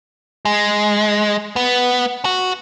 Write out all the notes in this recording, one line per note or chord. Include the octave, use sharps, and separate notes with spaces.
G#3
B3
F#4